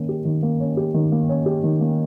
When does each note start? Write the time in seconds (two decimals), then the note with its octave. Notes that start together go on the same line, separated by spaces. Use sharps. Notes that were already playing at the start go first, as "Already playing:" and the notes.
Already playing: D#3 A#3 C#4
0.09 G4
0.25 D#3
0.43 A#3
0.60 C#4
0.77 G4
0.94 D#3
1.12 A#3
1.29 C#4
1.46 G4
1.64 D#3
1.81 A#3